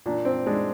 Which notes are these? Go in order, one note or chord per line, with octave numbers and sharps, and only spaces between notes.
A#2 D4
C4
G#3 D4